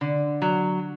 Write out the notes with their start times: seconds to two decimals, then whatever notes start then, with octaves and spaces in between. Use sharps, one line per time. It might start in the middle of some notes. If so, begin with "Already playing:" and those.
0.01 D3
0.42 F#3